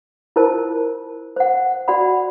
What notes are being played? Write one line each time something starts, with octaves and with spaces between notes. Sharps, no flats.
E4 F4 A#4 C5 A5
C5 F#5
F#4 D5 F#5 B5